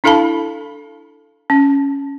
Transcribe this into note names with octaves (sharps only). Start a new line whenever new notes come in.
D4 E4 A4 F5 A5 B5
C#4